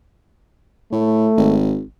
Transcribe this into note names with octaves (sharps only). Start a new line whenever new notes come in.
A2 A3
G#1